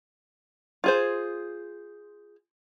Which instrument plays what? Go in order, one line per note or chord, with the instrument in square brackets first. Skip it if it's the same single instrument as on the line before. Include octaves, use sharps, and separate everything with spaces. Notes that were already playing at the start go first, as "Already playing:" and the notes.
[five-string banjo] F4 G#4 C5